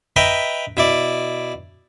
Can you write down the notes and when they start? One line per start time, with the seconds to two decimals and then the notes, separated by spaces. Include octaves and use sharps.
0.16 B4 D#5 E5 G5 A#5
0.77 B2 E4 D5